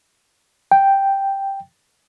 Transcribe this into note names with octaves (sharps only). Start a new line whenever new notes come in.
G5